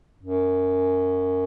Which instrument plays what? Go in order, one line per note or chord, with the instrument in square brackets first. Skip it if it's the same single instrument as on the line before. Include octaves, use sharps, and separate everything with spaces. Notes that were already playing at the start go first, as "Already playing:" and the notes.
[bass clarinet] F#2